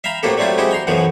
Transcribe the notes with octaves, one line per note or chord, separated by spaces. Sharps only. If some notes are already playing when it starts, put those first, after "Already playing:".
E5 F5 G5 A#5 B5
A2 A#3 C4 F#4 G4 A4
F#3 G3 A3 C4 E4 F4
G#3 C4 E4 F#4 G4
G5 A#5 C6
B1 F#2 B2 E3 F3 F#4